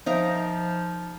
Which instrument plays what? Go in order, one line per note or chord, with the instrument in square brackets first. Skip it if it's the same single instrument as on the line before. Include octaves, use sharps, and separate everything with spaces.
[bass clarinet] F3 [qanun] D#4 A#4 A#5 [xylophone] C5 E5 F5